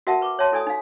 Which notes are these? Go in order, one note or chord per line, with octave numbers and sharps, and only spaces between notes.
F#4 A#4 E5 F#5 A5
B4 C#6 D6
C#5 D5 E5 A5 C6
E4 A4 D5 G#5 D#6
D#4 F5